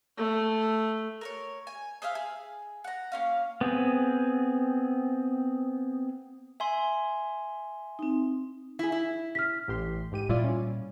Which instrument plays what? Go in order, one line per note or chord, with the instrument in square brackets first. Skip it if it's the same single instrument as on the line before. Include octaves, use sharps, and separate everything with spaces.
[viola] A3
[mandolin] A#4 B4 C#5
G#5
G#4 C5 E5 F5
G#4
F#5 A#5
A#3 C#4 F5
[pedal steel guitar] B3 C4 G#4
[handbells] E5 G#5 C6
[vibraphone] C4 D#4
[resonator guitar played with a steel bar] E4 G#4
E4
[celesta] F6 B6
[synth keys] A1 G4 C6
G#2 G4 D#7
[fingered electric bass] A#2 G3 [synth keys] E4 F4 D5
[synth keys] C#4